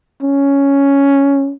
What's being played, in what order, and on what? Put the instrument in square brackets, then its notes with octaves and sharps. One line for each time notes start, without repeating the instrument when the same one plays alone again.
[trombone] C#4